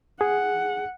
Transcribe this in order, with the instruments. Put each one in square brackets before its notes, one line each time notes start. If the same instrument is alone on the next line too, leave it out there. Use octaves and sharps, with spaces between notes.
[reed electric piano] G#4 [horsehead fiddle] F#5